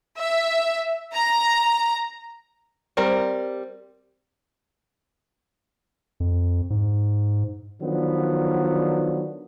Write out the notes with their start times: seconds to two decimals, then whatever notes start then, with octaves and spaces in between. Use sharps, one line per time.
0.17 E5
1.14 A#5
2.97 G3 C4 A#4
6.20 F2
6.70 G#2
7.81 D3 D#3 F3 F#3 B3 D4